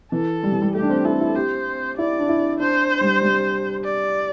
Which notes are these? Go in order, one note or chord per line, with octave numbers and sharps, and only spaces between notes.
E3 A4
G3
E3
G3
A3 G4
D4
C4
E4 A4
E4
G4 C5
E4 D5
D4
E4
D4 C5
G3
G3
D5